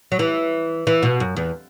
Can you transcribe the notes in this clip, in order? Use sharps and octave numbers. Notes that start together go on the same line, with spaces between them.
F#3
E3
E3
B2
F#2
E2